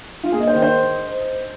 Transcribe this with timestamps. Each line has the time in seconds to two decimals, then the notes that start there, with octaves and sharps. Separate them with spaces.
0.23 F4
0.32 A#3 G#4
0.40 D#5
0.47 C5
0.55 D#3
0.62 C5